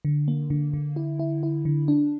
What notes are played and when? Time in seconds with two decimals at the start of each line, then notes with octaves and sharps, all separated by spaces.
0.05 D3
0.28 A#3
0.50 D3
0.73 D3
0.96 E4
1.19 E4
1.43 E4
1.65 D3
1.88 D4